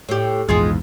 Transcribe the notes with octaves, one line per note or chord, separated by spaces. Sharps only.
A2 G4
A#1 E2 G#2 G#3 F4 G#4